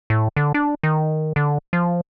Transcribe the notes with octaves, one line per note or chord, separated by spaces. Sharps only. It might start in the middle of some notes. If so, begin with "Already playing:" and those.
A2
D3
D4
D#3
D3
F3